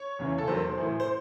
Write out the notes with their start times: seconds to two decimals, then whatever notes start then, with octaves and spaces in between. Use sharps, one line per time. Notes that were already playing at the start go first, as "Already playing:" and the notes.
Already playing: C#5
0.19 E2 C#3 E3
0.38 A4
0.47 E2 D#3 F#3 C5
0.77 A2 E3
1.00 C5